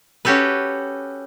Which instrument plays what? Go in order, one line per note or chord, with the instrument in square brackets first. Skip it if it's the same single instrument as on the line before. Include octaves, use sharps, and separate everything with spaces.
[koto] C#4 F#4 G4 A4 B4